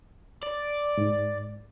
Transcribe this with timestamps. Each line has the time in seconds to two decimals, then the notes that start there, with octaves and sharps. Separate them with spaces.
0.43 D5
0.97 G#2